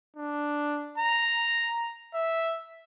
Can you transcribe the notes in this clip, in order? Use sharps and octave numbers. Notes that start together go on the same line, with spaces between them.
D4
A#5
E5